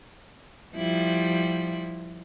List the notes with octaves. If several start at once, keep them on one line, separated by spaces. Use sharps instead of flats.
F3 G3 E4